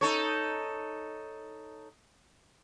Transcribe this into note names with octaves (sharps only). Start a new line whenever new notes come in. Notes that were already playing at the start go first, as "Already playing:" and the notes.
D#4 A4 C#5